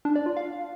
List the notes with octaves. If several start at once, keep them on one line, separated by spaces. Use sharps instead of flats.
D4
D5
F4
F5